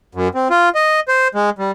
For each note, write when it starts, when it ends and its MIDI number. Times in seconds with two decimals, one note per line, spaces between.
0.15 0.28 42
0.35 0.48 60
0.50 0.69 65
0.75 1.00 75
1.08 1.28 72
1.35 1.50 56
1.59 1.71 55